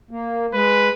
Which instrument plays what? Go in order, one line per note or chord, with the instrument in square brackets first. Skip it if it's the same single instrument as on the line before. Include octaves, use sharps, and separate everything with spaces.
[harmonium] A#3
[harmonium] G#3 [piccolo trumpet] B4